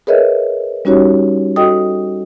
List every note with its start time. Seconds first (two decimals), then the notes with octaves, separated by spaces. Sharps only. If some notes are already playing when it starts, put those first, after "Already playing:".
0.07 G#4 A#4 B4 C#5 D#5 E5
0.85 G3 C#4 D#4 F#4 G4 C#5
1.56 F#4 A4 D#5 G5 D#6